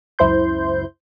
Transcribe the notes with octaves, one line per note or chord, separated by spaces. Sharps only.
C#2 F#2 E4 C5 C6 G6